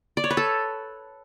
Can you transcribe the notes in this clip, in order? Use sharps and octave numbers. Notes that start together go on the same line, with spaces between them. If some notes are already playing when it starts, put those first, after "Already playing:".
D5
C#5
B4
A4